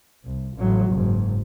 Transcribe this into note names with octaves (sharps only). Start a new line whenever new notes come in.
C2
A1 F#3
F#1 G#2